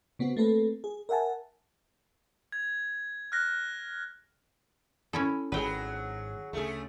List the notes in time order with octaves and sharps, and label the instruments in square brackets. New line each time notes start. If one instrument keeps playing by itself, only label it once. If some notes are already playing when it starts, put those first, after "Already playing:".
[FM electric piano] C#3 B3 C4 F#4
A3 A#3 C4 A4 B4
G#4
A#4 E5 F#5 G#5 A5
[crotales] G#6
F6 F#6 A#6
[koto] C#4 E4 A4
[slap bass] G#1 G#2 [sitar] F#3 G#4 [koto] B4 G5
[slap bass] D2 C#3 [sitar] A3 G#4